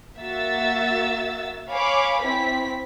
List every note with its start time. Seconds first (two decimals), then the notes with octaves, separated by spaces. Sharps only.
0.18 A#3 F#4 E5 E6 A6
1.70 C#5 F5 G#5 B5 D6
2.23 C4 E4 B6